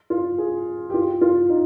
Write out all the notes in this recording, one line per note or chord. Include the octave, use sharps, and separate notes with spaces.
F4
G#4
G4
F4
F4
D#4